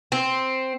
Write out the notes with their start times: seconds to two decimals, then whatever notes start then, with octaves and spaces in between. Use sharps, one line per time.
0.12 C4